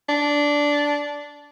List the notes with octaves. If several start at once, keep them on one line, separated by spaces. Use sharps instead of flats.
D4